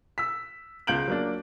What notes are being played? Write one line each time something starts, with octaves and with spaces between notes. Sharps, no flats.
E6 B6
C#2 F5 G6 D7 F#7
F#3 A#3 D4